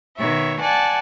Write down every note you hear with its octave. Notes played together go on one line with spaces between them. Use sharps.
B2 D#3 C#5 E5
D5 F#5 G#5 A5